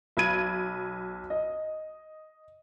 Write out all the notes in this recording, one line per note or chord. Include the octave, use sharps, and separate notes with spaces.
B1 B5 G#6 D#7
D#5